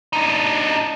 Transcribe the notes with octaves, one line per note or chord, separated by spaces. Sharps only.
D4 D#4